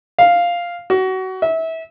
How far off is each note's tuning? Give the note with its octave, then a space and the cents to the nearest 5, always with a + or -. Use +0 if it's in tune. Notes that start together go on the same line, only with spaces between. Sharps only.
F5 +0
F#4 +25
E5 -25